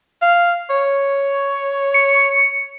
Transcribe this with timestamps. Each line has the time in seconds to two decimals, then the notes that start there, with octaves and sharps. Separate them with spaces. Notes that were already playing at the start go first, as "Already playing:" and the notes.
0.22 F5
0.70 C#5
1.94 C#7